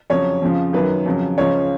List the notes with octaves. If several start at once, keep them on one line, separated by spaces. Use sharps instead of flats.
F2 C#3 F#3 C#5
F2 C#3 F3
F#2 D#3 F#3 B4
F2 C#3 F#3
C#2 C#3 F3 C#5